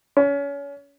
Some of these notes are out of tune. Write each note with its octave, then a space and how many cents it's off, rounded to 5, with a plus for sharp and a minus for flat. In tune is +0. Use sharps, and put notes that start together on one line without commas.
C#4 +30